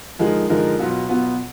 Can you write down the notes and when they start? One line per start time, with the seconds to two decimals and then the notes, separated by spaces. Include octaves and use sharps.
0.19 D3 F3 G#3 D#4 A#4
0.50 D3 F3 G#3 D#4 A#4
0.79 B2 F#3 B3 F4
1.09 B2 F#3 B3 F4